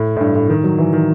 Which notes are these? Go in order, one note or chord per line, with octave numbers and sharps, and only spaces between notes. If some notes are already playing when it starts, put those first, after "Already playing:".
Already playing: A2
A2
G2
A2
D#3
F#3
E3
D#3